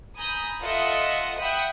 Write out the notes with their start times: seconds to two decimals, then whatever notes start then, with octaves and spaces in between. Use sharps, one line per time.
0.18 G#5 A#5 B5 D#6 G6
0.61 F4 A4 D#5 E5 F#5
1.40 E5 F#5 G5 B5 D#6 F#6